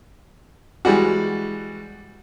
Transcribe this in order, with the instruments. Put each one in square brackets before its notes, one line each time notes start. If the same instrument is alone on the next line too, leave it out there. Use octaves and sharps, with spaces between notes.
[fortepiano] E3 G3 G#3 F#4